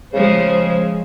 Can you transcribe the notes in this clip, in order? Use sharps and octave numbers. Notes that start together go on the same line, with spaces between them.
C#3 F3 G#3 C5